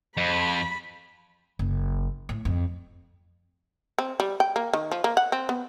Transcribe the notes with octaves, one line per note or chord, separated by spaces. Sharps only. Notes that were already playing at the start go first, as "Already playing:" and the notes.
F2 B5
F#1
A2
F2
C4
G3
G5
A#3
D#3
F3
A#3
F#5
C4
B3